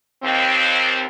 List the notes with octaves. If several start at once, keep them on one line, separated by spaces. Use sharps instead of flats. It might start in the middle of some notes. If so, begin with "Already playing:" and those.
D#2 C4